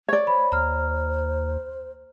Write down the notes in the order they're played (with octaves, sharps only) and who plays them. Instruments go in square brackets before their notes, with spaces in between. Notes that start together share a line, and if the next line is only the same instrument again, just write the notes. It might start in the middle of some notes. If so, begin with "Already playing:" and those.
[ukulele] C#5 D5
[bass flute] C5 [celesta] B5
[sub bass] D#2 [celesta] A#5 F6